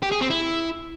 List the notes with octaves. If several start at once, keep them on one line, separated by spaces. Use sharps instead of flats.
G4
G#4
C4
E4